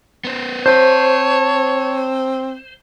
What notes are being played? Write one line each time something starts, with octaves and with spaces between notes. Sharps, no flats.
B3 C5
C4 C5 C#5 F5 A5